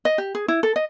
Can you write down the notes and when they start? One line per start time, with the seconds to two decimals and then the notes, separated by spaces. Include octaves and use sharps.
0.05 D#5
0.18 G4
0.35 G#4
0.48 E4
0.63 A4
0.76 D#5